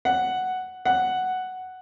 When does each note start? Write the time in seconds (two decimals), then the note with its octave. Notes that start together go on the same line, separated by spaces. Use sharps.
0.05 F#5
0.85 F#5